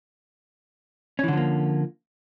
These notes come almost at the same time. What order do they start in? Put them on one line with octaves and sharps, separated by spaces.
C#4 E3 D3 F3 A#3